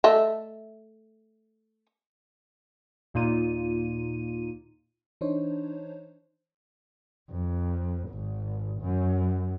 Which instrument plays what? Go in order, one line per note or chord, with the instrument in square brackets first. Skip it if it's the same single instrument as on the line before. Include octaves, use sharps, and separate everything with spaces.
[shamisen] A3 D#5 E5
[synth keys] D#2 A#2 A#3 D#4 F4 D#7
[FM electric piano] E3 D4 D#4 C5 C#5
[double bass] F2
G#1
F#2